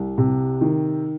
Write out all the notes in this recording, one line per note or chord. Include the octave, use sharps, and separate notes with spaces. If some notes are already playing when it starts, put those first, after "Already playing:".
Already playing: C2
C3
D#3